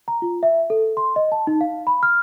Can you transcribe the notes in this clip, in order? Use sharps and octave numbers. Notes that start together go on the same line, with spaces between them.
A#5
F4
E5
A4
C6
D#5
A5
D#4
F5
B5
F6